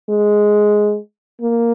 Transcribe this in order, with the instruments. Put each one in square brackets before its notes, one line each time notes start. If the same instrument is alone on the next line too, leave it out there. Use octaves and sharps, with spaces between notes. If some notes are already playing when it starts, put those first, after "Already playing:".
[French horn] G#3
A#3